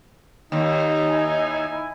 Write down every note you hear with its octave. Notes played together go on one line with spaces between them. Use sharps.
D#2 D#4
E4 G#5